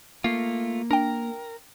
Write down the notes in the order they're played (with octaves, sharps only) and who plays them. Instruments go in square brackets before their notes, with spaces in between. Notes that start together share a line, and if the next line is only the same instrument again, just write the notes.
[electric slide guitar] A3 F4 [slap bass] A#3 [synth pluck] C7
[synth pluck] D4 G5 [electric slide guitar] A#4